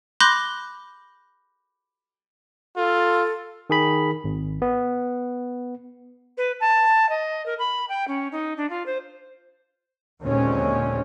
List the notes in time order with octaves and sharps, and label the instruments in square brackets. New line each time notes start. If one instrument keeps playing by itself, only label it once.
[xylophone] B5 C6 D6 F#6 G6 A#6
[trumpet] F4 [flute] A4
[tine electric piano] D#3 G#4 B5
G#1
B3
[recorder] B4
A5
D#5
A#4
B5
G5
C#4
D#4
D4
F4
C5
[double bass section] D#2 A#2 D3 G#3 C4 C#4